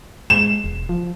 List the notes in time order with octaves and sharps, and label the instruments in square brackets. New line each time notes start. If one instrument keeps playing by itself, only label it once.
[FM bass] G#3 [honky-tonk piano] E7
[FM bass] E1
F3